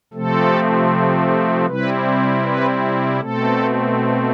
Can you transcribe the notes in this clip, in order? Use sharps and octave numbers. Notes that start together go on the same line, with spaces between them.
C3 F3 A3 C4 A4
C3 G3 C4 E4 B4
B4
B2 A3 C4 A4